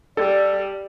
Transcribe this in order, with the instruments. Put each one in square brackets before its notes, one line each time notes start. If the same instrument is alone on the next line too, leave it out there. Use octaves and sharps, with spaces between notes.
[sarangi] G3 [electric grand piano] A4 [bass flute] D5